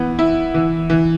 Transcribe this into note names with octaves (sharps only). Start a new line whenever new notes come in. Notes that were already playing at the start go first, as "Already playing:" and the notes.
Already playing: E3 B3
E4
E3
E3